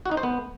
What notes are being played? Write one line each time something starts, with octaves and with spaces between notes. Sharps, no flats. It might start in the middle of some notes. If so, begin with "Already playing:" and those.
F#4
D#4
C5
B3